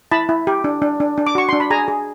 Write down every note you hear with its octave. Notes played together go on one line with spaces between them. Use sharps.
E4 A5 B5
E4
G4
D4
D4
D4
D4
D6
F#4 C#6
D4 C6
B5
G#4 G#5 A#5
G#4